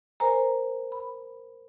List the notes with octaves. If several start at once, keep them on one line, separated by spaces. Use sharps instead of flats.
A#4 C5 G#5 A#5
B5